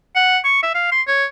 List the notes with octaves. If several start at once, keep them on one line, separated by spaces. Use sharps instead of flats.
F#5
C#6
E5
F5
C6
C#5